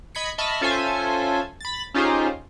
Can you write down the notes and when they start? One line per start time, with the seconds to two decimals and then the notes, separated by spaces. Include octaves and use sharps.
0.15 D#5 B5 G#6 B6 C#7
0.38 D#5 E5 A5 B5 C#6 F6
0.61 C#4 F4 A4 C5 E5 G#5
1.61 B5 A6
1.94 C#4 D#4 F4 G4 G#4 C5